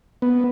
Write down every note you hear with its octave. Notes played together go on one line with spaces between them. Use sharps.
B3